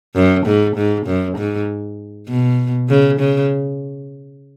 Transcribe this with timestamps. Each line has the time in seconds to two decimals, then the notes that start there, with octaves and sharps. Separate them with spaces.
0.15 F#2
0.46 G#2
0.76 G#2
1.06 F#2
1.37 G#2
2.28 B2
2.89 C#3
3.19 C#3